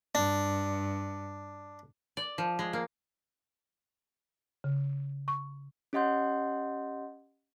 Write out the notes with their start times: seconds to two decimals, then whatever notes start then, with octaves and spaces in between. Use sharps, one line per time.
0.15 G2 D4
2.17 D5
2.38 F3
2.59 G#3
2.73 A#3
4.64 C#3
5.28 C#6
5.93 C#4 G4 D#5 F#5 C6 G6